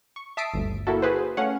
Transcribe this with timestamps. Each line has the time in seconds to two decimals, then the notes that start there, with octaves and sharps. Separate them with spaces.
0.16 C#6
0.37 E5 A5 D#6 B6 C7 D7
0.54 G1 D2
0.87 A#3 E4 F#4 A4
1.02 F#4 G#4 B4 C5
1.37 A3 C#4 F5 F#5